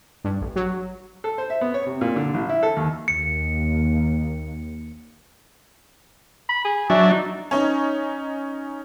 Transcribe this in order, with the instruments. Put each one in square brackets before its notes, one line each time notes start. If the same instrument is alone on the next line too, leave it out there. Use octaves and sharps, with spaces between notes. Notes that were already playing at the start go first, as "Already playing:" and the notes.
[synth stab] G2
A1
F#3
[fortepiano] A4
C5
E5
B3
C#5
C3
A#2
D3
A1
E4
A4
D#2
[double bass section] D#2 [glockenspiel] C#7
[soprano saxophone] B5
G#4
[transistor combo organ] F#3 D4 [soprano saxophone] E5
[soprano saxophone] D#4
[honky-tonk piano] C#4 D#4